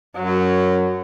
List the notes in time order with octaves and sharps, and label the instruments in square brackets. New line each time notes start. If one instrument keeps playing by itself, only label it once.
[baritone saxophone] F#2 [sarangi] F#3